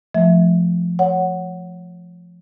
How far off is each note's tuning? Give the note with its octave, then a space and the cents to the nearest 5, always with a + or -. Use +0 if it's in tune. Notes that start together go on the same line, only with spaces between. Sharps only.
F3 +0 A3 -20 E5 -20
C#5 +0 F#5 +0